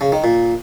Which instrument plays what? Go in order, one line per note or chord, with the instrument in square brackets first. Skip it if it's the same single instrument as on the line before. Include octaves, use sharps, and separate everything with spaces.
[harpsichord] C#3
D#3
A#2